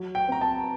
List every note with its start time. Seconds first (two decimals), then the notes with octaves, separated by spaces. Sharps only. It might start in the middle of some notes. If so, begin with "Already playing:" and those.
Already playing: F#3
0.15 G5
0.28 C4 A#5
0.41 A5